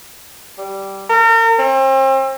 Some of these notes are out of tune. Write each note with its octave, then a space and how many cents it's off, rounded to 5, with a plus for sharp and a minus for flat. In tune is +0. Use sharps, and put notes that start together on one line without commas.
G3 -10
A#4 -40
C4 +40